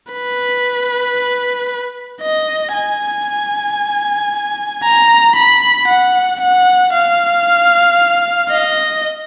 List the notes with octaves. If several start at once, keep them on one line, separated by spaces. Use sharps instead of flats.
B4
D#5
G#5
A#5
B5
F#5
F#5
F5
D#5